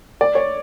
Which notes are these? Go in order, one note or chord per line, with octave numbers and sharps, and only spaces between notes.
D5
C#5